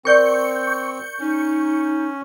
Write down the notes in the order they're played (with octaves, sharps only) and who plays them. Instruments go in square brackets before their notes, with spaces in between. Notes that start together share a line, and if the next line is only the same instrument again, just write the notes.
[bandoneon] C4 [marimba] A#4 D5 [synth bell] C#6 G6 C#7
[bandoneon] C#4 [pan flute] D#4